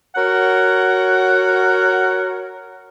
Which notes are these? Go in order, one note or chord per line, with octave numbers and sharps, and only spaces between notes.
F#4 A#4 C#5 F#5